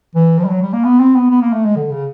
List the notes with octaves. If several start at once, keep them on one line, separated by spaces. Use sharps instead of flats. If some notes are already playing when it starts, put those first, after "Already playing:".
E3
F3
G3
F#3
G3
A#3
B3
C4
B3
B3
A#3
A3
G#3
D3
C#3